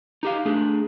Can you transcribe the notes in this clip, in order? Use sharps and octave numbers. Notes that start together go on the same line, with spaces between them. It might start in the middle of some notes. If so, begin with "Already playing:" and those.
D#4 G4 F5
A3 D4 G#4